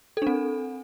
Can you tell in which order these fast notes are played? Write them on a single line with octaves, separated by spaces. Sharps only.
A4 D4 C4